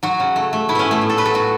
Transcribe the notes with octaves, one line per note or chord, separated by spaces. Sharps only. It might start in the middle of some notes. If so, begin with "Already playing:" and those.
F#3 F#4
C#3
A3
A3
A2 E4
B3 C#4
A2
A3
A2
A4
F#3 B4
A4
F#3 F#4